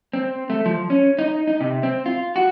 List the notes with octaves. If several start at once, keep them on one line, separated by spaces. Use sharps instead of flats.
C4
A3
F3
C#4
D#4
D#4
C3
C4
F4
F#4